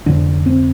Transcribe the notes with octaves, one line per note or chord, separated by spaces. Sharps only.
F1 F2 D3 D4
C4